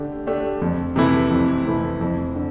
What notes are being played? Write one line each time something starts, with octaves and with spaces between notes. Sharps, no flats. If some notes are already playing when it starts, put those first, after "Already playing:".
Already playing: D3 A3 D4 G4
A3 D4 G4
F2
C3 E3 A3 E4
F2
C3 E3 A3 E4
F2
D3